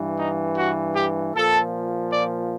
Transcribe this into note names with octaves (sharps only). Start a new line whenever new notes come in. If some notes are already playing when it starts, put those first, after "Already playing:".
Already playing: G2 E3
D#4
F#4
G4
A#2 F3 A4
D5